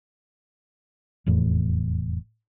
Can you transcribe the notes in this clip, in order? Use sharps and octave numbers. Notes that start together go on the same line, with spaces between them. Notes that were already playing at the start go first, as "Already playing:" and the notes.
F1 E2 A2